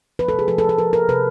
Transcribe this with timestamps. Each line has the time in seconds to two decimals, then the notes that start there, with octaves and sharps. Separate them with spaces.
0.19 F3 B4
0.29 A4
0.34 C3
0.39 G#4
0.48 F3 A4
0.58 A4
0.63 F3
0.69 A4
0.78 F3 A#4
0.93 F3 A#4
1.09 C3 B4